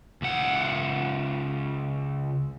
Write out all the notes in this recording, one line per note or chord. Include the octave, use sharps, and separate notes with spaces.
C#2 F#5